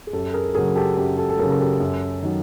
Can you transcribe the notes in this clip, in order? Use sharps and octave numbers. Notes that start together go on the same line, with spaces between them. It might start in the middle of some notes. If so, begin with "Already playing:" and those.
G#4
F#2 G4 A4
G#4 A#4
C#3 F#3 G#4 A#4
G4 A4
F#2 G4 A4
G4 A4
A4
C#3 F#3 G#4 A#4
A#4
G4 A4
F#2
D#3 F#3